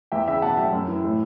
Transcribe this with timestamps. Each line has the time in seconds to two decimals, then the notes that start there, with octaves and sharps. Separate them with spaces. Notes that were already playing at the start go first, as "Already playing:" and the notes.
0.12 E2 E5 G5
0.28 C#3 E5 G5
0.42 B2 F#5 A5
0.57 F#3 E5 G5
0.72 F#2
0.88 E3
1.04 A2